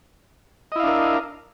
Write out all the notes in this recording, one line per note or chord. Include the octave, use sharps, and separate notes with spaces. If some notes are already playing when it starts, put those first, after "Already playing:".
D4 E4 A#4 D#5 F5